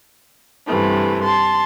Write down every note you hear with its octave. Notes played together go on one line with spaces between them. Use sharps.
G2 C3 E3 A3
A5 C6